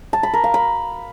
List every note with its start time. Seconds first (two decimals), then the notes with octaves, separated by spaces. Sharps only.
0.13 A5
0.23 B5
0.34 A#4
0.44 F5
0.54 B5